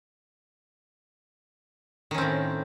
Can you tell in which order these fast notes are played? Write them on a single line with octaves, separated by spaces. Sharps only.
D#3 C#4 C4 A2